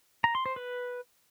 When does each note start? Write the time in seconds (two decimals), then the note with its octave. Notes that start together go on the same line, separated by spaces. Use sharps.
0.24 A#5
0.35 C6
0.46 C5
0.56 B4